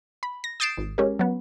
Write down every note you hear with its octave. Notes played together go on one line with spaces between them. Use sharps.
B5
A#6
D#6 G6 A6 C7 D7 E7
G#1
G#3 C#4 G4 A#4
F#3 B3